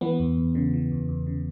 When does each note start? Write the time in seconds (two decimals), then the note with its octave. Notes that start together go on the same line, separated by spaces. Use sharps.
0.01 E3 B3
0.19 E2
0.37 E2
0.55 C#3
0.73 E3
0.91 E2
1.09 E2
1.27 C#3